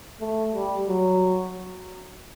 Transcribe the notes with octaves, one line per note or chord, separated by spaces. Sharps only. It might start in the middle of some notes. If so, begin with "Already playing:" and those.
A3
G3
F#3